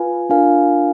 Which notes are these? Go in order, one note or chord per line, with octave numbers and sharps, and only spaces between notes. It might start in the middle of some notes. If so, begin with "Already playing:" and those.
Already playing: F4 B4 F5 G#5
D4 F4 A#4 F5 G#5